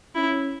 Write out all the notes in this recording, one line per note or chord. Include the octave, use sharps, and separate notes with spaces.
C#4 E4